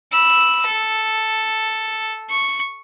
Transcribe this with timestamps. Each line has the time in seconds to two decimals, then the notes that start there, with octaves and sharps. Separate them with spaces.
0.12 B5 E6
0.66 A4
2.30 C#6